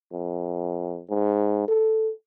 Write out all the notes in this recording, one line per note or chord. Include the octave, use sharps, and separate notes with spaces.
F2
G#2
A4